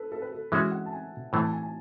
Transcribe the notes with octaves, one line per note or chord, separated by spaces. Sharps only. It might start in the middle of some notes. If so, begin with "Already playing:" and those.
Already playing: A4 B4
A4
B4
A4
E3 G#3 C#4 F#4 E5
F#5
A5
G#5
A2 E3 A3 A5
A5
G#5
G#5